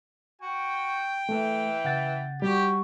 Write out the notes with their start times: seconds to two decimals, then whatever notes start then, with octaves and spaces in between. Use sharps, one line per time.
0.42 F#4 G5
1.29 E3 A3
1.84 C#3 F#5 A6
2.42 G3 F#4 G4